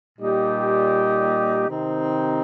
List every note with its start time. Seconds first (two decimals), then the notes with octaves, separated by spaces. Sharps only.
0.19 A#2 G3 D#4 G4
1.69 C3 D#3 C4 D#4